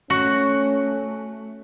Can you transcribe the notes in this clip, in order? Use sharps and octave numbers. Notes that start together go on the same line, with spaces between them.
A3 C#4 F#4